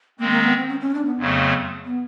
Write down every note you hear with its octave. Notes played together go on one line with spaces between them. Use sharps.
D#3 G#3 A#3 C4
A#3
B3
C4
C#4
C#4
D4
B3
F2 C#3 F#3 A3
B3